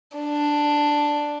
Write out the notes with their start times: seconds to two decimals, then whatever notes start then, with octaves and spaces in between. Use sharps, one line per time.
0.17 D4